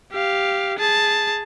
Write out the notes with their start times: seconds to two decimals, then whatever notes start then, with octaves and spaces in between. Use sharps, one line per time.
0.12 G4 F5
0.78 G#4 A5